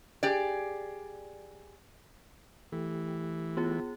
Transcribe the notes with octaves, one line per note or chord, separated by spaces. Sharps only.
G4 G#4 D5
E3 A3 G4
B3 F4 G#4